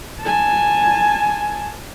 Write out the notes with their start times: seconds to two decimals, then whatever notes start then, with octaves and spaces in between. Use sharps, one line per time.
0.22 G#5 A5